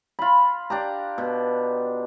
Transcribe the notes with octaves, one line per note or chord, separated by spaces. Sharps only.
F4 B5
D4 G4 A#5
B2